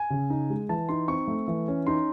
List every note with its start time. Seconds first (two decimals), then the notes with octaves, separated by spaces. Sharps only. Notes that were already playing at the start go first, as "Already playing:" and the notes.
Already playing: G#5
0.10 C#3
0.30 D#4
0.50 G#3
0.69 E3 A5
0.89 D#4 C6
1.08 C4 C#6
1.27 A3
1.48 E3
1.68 C#4
1.87 D#4 C6